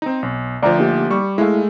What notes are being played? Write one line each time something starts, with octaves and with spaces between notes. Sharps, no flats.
C4 D#4
B1
D2 F3 D5 A#5
A#3 D#4 G4
G3 C#6
G#3 A3 E4 F5